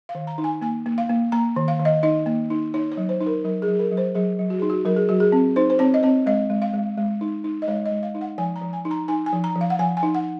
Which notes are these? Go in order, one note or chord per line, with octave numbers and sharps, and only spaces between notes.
F5
D#3
A#5
D#4
G#5
A#3 G#5
A#3
F5
A#3
A#3 A#5
D#3
F5
D#3
D#5
D#4 D#5
A#3
D#4
D#4 C#5
C#5
F#3
C5
D#4
A#4
F#3 A#4
G#4
F#3
G#4
A#4
F#3
C5
F#3 G#4
F#3
F#4
D#4 G#4
F#4
F#3 A#4
G#4
F#3 F#4
G#4
C4
D#4 C5
C5
C4 C#5
D#5
C4 C#5
G#3 D#5
G#3
F5
G#3
G#3
D#4
D#4
D#5
G#3 C#5
D#5
G#3
F5
D#4
F#5
F3 G#5
A#5
F3
G#5
D#4
A#5
D#4 G#5
G#5
F3
A#5
F3
F5
F#5
F3 G#5
G#5
D#4
F#5